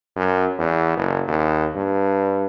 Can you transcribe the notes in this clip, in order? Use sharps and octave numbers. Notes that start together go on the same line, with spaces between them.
F#2
E2
F#1
D#2
G2